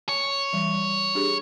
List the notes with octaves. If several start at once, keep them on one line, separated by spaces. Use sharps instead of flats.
C#5
E3 G3
D4 G4 G#4